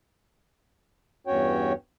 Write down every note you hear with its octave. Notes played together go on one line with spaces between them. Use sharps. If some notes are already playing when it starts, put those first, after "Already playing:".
E2 G2 C#4 F#4 C#5 G5